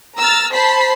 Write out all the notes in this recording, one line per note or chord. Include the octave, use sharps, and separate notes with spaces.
A#5 E6 F6 A6
C5 A5 B5 B6 C7